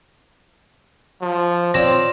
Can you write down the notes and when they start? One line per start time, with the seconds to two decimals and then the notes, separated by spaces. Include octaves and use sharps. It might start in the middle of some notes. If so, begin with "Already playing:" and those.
1.22 F3
1.74 C4 F4 C#5 D5 A#6 E7